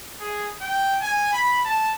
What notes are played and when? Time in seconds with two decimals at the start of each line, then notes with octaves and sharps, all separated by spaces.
0.20 G#4
0.61 G5
1.01 G#5
1.33 B5
1.65 A5